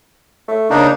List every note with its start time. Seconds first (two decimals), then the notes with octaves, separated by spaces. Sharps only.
0.48 A3
0.70 C#3 A#3 D4 D#4